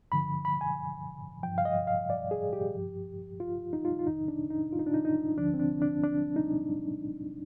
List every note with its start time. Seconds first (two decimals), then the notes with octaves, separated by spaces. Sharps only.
0.12 G2 D3 F3 B5
0.45 B5
0.61 G#5
1.43 G2 F3 G5
1.58 F5
1.65 D#5
1.87 F5
2.10 D5
2.31 G#4
2.53 G4
2.75 G2 F3
3.40 F4
3.73 D#4
3.85 F4
3.99 F4
4.07 F2 D#3 D#4
4.28 D4
4.50 D#4
4.72 F4
4.79 D#4
4.87 D4
4.94 D#4
5.05 D#4
5.37 D2 D3 F3 D4
5.54 C4
5.60 D4
5.82 D4
6.03 D4
6.36 D#4